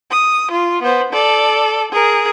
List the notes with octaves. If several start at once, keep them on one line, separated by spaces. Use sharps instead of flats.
D#6
F4
B3 C5
A4 D5
G#4 A#4